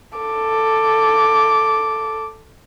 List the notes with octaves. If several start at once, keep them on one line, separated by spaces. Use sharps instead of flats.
A4 D6